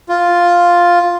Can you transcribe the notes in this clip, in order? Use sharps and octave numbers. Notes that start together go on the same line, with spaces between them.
F4